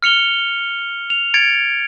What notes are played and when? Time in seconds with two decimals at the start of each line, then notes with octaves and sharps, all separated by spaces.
0.02 F6 C#7 F7 G7
1.10 F7
1.34 G#6 A6 C#7 D7 F7